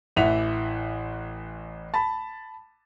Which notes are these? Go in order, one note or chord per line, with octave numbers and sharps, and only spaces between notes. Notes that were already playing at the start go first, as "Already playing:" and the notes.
A1 E3 E5 F#5 F7
A5 B5